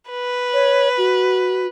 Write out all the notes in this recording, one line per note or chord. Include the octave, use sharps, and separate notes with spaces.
B4
C#5
F#4